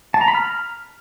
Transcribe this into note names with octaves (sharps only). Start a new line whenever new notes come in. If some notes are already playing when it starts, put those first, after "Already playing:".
A5
A#5
B5
F6